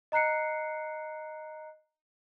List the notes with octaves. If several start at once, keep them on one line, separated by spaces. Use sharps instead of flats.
D#5 A#5 F#6 C7 C#7